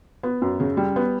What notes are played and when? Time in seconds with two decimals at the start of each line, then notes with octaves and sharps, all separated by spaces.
0.23 B3
0.42 F#2
0.60 C#3
0.77 G3
0.96 B3